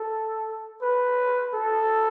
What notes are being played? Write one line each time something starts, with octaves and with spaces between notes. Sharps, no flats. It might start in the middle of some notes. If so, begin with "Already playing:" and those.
Already playing: A4
B4
A4